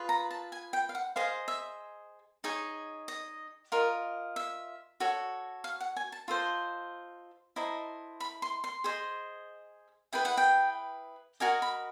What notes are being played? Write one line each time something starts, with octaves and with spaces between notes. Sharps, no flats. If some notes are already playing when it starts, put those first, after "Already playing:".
Already playing: F4 G#4 B4
A#5
A5
G#5
G5
F5
F#5
G#4 C5 D#5 F5
E5
D#4 G#4 C#5
D#5
F4 A#4 D#5
E5
F#4 A4 C#5
F5
F#5
G#5
A5
F4 A4 C5 D#5
E4 A4 C5 D#5 A#5
B5
C6
C6
G#4 C5 D#5
E4 G#4 B4 G5
F#5
G5
F#4 A#4 D#5 G#5
B5